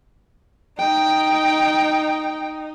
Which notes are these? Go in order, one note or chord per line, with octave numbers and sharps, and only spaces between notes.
D#4 G5